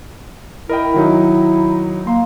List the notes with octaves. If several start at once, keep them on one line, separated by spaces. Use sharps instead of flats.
E4 A#4 D#5 G5
D#3 F#3 D#4
A#3 C6